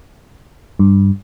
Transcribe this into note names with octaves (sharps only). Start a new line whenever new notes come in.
G2